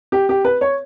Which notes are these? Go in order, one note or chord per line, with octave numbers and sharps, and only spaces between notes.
G4
G4
B4
C#5